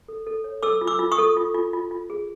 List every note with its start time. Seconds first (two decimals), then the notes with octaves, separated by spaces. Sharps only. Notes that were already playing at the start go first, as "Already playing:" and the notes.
0.09 A4
0.27 A4
0.44 C#5
0.63 A4 D6 E6
0.81 F4
0.87 D6 E6
0.99 F4
1.12 C#6 D#6
1.18 A4
1.37 F4
1.55 F4
1.73 F4
1.91 F4
2.10 G#4